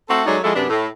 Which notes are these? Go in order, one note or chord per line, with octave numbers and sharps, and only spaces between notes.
A3 C4 F#4 A4
F#3 G#3 A3 C#4 D#4 D5
F3 G#3 E4 F#4 A4
F#2 C3 B3 D4
A2 A3